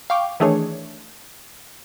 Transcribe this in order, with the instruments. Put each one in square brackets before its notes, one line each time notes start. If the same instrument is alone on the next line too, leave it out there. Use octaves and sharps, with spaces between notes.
[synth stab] F5 G5 C#6 D6
D#3 E3 A3 D4 G#4 C#5